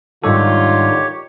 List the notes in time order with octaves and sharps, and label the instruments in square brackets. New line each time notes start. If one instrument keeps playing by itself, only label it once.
[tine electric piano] G#2 G3 A4 [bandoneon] D3 D#3 [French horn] F4 [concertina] G4 C#5